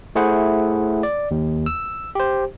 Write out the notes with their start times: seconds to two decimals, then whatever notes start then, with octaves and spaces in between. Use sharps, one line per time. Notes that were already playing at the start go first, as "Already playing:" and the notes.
0.15 A3 E4 G#4 C5 F#5
1.03 D5
1.31 D#2
1.66 E6
2.15 G4 C5